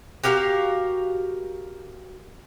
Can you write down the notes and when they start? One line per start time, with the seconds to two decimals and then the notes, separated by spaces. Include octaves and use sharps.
0.24 F#4 G4 A#4 F5